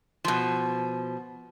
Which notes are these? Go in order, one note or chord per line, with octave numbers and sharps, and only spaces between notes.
B2 F3